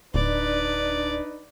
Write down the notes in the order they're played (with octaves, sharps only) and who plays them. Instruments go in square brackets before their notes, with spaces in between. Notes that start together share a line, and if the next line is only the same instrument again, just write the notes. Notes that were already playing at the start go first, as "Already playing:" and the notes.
[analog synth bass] D1 [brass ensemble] D4 D#4 B4 [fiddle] D5